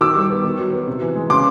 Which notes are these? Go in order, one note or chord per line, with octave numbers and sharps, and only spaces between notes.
D#3 D6 E6
G3
B3
D#3
F#3
B3
C3
E3
G#3
C#3 C6 D6